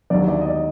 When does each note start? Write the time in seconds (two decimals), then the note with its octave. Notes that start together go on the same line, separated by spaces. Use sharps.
0.10 D#2 D3 F#3 D5
0.28 D5
0.41 D#5
0.46 D5